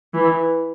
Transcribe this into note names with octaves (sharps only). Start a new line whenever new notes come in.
E3